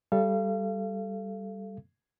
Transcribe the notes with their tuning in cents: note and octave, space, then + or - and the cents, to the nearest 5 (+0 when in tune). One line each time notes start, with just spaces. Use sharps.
G3 +0 A4 +0 F5 -35